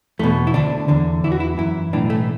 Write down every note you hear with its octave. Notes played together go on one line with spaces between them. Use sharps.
E2 B2 A3
E4
D2 D3 D4
E2 D3
E2 E3 E4
F#4
E4
F#2 E3 E4
B1 A2 E3 D4
A3